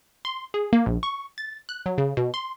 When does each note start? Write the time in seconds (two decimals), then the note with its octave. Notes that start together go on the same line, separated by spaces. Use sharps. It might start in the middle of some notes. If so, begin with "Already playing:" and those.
0.25 C6
0.54 G#4
0.73 A#3
0.86 A#1
1.03 C#6
1.38 A6
1.69 F#6
1.86 F#3
1.98 C#3
2.17 B2
2.34 C6